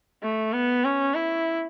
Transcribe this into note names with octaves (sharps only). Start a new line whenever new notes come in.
A3
B3
C#4
E4